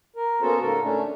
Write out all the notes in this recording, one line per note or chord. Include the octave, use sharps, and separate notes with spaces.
A#4
A#3 B3 C#4 F#4 A4 C5
G#2 C#3 A4 A#4
A3 C#4 D4